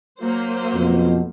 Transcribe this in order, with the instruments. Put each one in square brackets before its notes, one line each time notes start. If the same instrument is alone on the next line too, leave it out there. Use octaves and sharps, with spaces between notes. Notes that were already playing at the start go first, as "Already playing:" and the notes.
[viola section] F#3 A#3 C5
[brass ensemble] F2 B2